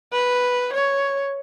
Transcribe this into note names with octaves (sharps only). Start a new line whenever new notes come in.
B4
C#5